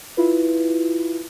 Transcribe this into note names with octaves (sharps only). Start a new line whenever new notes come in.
E4 F4 B4